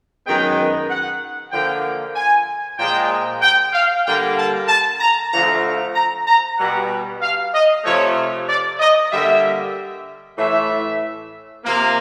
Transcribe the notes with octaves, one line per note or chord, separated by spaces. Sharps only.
F#2 D#3 G#3 B3 G5
F#5
D3 F3 A#3 G5
G#5
A#2 F3 G#3 G5
G5
F5
D3 G3 A#3 G5
A5
A5
A#5
D3 F3 A3 A#5
A#5
A#5
B2 G3 B3 F#5
F5
D#5
C3 F3 A3 C#5
D5
D#5
D3 G3 A#3 E5
A2 E3 A3 E5
C3 F3 A#3